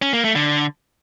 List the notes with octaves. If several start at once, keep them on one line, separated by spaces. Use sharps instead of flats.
C#4
A#3
A3
D3